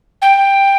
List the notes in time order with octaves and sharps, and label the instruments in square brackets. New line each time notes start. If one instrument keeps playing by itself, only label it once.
[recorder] G5